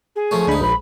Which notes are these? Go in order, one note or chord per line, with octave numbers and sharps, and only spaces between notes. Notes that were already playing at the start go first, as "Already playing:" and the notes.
G#4
F3 A3 C#4
D2 G#2 D4 D#4 B5
A#1 B5